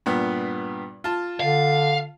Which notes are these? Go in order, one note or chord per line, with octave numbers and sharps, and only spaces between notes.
G2 A#2 B3
F4 A5
D3 F5